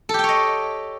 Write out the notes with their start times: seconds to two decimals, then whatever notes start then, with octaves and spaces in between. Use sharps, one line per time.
0.09 A4
0.14 G4
0.19 G5
0.24 C#5
0.29 D#5